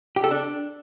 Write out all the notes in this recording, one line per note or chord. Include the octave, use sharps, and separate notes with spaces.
G4
A4
D4